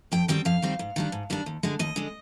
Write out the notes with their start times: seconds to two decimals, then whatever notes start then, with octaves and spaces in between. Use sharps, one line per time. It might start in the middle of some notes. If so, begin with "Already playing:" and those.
0.12 F2 G5
0.28 D#3 G3 C4 G5
0.45 F2 F5
0.62 D#3 G3 C4
0.79 G#2
0.96 D#3 G3 D4
1.12 G#2
1.30 D#3 G3 D4
1.46 D#2
1.63 D3 G#3
1.79 D#2 D#5
1.96 D3 G#3